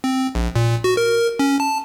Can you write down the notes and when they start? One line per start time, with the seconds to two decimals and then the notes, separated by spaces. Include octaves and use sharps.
0.04 C4
0.35 A#1
0.56 A#2
0.84 F#4
0.97 A#4
1.39 C#4
1.60 A5